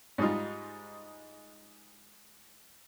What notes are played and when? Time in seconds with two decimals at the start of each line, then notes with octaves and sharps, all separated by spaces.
0.18 G#2 G3 G#3 D#4 F4